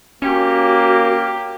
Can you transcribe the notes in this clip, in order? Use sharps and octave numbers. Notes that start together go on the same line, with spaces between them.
A#3 C#4 F#4 G4